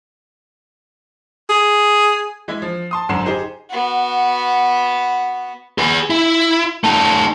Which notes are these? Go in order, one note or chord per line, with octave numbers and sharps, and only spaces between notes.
G#4
E3 G#3 E4
F3
A5 C6 D#6
G#1 F#2 D3 C6 C7 E7
D#4 G4 G#4 C5
B3 F#4
G#4 B4
E4
A3 D#4